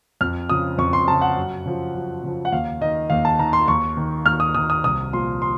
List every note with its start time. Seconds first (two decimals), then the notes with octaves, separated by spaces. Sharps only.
0.21 F2 F6
0.49 C#3 F3 D#6
0.78 F2 C#6
0.93 C6
1.08 C#3 F3 A5
1.21 F#5
1.36 F#2
1.65 C#3 F3
1.94 F#2
2.23 C#3 F3
2.45 F#5
2.52 D#2 F5
2.81 D#3 D#5
3.10 D#2 F5
3.25 A5
3.39 D#3 A#5
3.53 C6
3.68 D#2 C#6
3.97 D#3
4.26 D#2 F6
4.40 D#6
4.55 D#3 D#6
4.70 D#6
4.84 C2 D#6
5.12 A#2 F3 C6
5.42 C6